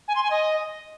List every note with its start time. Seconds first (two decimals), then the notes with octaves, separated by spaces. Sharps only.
0.08 G#5
0.16 C6
0.23 G#5
0.31 D#5